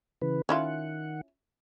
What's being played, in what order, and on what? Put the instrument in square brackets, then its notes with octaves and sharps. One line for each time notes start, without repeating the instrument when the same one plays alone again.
[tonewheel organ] C#3 E3 B4
[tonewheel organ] D#3 F#5 [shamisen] C#4 E4 F4